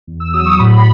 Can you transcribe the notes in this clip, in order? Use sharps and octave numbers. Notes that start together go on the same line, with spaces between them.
E2
E6
F#3 D#6
C#6
A2 B5